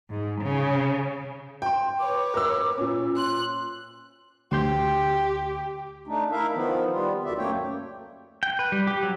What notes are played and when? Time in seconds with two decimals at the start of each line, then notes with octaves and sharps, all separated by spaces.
0.10 G#2
0.43 C#3
1.62 G5 C6
1.99 B4 C#5 D6
2.34 A#4 E6
2.78 A#2 C#4
3.17 C6 F#6
4.52 D2 G4 C6 G6
6.07 A3 D4 D#4
6.32 D#4 E4 A#4 E5 F5
6.54 D#3 F3 B3
6.92 G3 B3 F4
7.25 D2 B2 D3 D#3 D5 E5
7.38 F#2 A3 A#3 C#5 G5
8.43 G5
8.59 B4
8.72 G3
8.87 G4
9.03 F#3